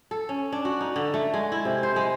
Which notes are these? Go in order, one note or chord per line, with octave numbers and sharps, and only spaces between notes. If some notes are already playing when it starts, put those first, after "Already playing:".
A4
C#4
D4
F#4
D#4
D3
A3
G#3
E4
C3
C5
G#3